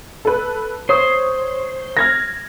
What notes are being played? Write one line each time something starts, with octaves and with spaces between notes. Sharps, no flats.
A4 B4
C5 C#5 D#6
F6 G#6 A#6